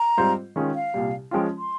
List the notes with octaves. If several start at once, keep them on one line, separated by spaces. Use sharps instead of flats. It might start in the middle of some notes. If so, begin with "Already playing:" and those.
Already playing: A#5
G#2 G3 C4 F4 C5
D#3 G#3 C#4 F4 G#4
F5
C2 A#2 G3
F3 G#3 C#4 F4 G5
C6